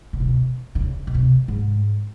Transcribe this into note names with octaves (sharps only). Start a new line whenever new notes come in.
B2
A#2
B2
D3
C#3
B2
C3
G#2